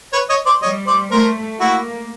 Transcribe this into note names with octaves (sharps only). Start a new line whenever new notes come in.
B4 C#5
C#5 D#5
C5 D5
G3 C#5 D#5
C5 D5
A3 A#4 C5
A#3 E4 F#4